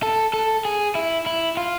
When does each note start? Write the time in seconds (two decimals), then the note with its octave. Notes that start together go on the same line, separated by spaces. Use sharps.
0.03 A4
0.34 A4
0.65 G#4
0.95 E4
1.26 E4
1.57 F4